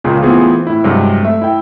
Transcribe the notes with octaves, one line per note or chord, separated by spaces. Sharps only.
C#2 A#2 C#3
E3 A3 B3 C4 F4 G#4
A2 E4
G2 C3 F#3 G#3
A3 E5
E4 E5 G5